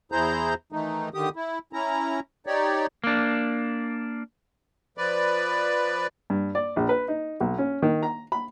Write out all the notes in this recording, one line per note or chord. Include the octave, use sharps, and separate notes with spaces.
E2 E4 G#4 C5 A#5 G6
D#3 E3 A3 D#4
D3 D#3 G4 D#6
E4
C#4 E4 A#5
D#4 G4 C#5 D5
A#3 D4
F3 B4 D5
G2
D5
A#1
B4
D#4
B1
C#4
D#3
A#5
B5